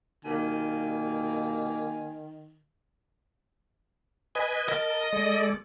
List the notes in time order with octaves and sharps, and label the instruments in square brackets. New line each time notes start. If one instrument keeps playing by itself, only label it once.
[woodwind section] C2 B2 A#3 [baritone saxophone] D#3 [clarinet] G#5
[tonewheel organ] B4 D#5 G#5
[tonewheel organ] A#4 A5 [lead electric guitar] D#5
[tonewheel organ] G#3 A4 D5